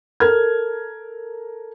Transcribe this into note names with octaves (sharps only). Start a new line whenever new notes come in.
A4 A#4 F6 G#6